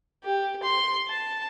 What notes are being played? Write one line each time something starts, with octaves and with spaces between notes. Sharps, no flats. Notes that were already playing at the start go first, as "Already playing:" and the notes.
G4
C6
A5